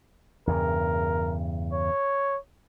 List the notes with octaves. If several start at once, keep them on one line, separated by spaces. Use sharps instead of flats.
E2 G2 C#3 A#4
C#5